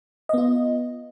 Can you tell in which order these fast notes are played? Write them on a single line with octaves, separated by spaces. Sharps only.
D#5 B3 F4